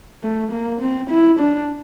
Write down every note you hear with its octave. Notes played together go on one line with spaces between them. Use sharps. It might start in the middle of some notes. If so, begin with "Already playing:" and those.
A3
A#3
C4
E4
D4